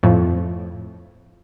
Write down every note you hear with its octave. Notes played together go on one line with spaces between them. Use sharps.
F2 A2